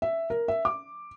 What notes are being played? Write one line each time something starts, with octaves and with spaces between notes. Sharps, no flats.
E5
A#4
E5
D6